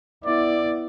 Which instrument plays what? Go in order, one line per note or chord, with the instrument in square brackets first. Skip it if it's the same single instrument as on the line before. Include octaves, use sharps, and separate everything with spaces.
[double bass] B3 E4 [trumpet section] D5